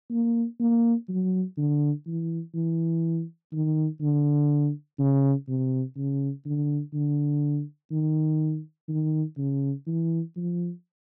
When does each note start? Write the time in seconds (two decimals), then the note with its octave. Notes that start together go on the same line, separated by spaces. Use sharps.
0.11 A#3
0.60 A#3
1.09 F#3
1.57 D3
2.07 E3
2.55 E3
3.52 D#3
4.01 D3
4.99 C#3
5.48 C3
5.96 C#3
6.46 D3
6.94 D3
7.91 D#3
8.89 D#3
9.38 C#3
9.87 E3
10.36 F3